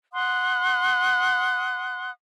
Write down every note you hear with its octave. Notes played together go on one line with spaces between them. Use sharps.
F#5 C6 D#6 F#6